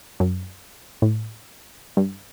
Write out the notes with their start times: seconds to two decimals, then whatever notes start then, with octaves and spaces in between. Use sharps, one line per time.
0.20 F#2
1.02 A2
1.97 G2